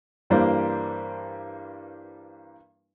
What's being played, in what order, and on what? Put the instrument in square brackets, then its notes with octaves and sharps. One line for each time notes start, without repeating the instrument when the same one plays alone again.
[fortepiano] G2 E3 G3 A#3 D4 C5